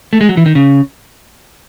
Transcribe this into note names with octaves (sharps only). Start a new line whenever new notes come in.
A3
G#3
F#3
E3
D#3
C#3